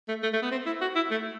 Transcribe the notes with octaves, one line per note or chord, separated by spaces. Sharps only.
A3
A3
A3
B3
C4
E4
F#4
E4
A3